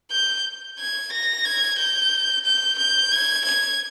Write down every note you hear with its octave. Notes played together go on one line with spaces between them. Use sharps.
G6
G#6
A#6
G#6
G6
G6
G6
G#6
G#6